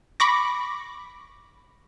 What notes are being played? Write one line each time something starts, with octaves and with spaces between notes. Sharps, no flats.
B5 C#6 D6 A#6